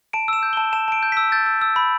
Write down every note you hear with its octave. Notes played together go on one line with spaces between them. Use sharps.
A5 D7
E6 E7
G6
A5 G7
A5 E7
A5 D7
G6
E6 B6
G6 A6
E6
E6
B5